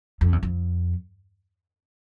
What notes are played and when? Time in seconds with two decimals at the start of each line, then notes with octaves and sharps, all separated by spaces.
0.21 F2
0.32 E2
0.43 F2